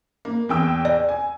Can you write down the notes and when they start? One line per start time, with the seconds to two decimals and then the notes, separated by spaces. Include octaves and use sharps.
0.25 A#3
0.49 E2 G5 E6
0.85 D5
1.09 G#5